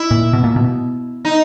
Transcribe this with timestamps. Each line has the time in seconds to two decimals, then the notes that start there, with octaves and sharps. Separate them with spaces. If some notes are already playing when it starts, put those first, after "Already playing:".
Already playing: E4
0.11 A#2
0.33 B2
0.44 A#2
0.56 B2
1.25 D#4